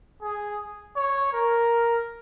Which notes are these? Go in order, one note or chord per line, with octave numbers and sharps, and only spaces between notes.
G#4
C#5
A#4